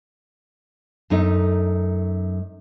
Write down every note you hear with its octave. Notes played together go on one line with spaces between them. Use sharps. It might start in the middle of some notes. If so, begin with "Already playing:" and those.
F#2 A3 D#4